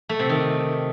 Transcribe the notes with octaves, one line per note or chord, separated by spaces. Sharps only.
A3
C3
D#3